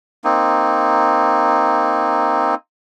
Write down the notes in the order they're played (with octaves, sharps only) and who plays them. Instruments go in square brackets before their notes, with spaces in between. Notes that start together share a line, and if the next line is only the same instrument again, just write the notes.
[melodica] A#3 C4 D#4